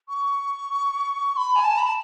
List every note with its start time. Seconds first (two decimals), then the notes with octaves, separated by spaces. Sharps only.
0.09 C#6
1.37 B5
1.55 G#5
1.64 A5
1.78 B5
1.86 A5